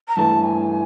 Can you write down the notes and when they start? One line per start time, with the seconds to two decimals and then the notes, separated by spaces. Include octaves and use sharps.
0.08 A#5
0.16 G2 E3 A3 A5
0.44 G#5